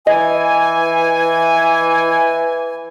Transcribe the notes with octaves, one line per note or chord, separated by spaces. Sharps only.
E3 D#5 G#5